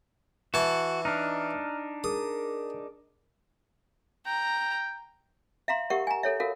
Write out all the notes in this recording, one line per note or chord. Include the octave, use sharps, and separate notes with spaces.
E3 F#4 A5
D4 D#4 A#5 F6 F#6
G#4 A#4 D6 D#6
G5 A#5
E5 F5 A#5 C6
G4 A#4 E5 F#5 C#6
G#5 A#5
A4 C#5 E5
F#4 A4 A#4 F5